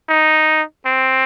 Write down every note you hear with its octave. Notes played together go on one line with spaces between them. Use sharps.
D#4
C4